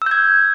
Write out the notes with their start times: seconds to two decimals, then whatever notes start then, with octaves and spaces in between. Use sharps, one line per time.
0.02 E6
0.06 G6
0.11 G#6